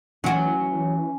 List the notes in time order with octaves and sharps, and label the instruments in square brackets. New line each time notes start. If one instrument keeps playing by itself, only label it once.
[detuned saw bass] E3 [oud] F#3 F#4 [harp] C#4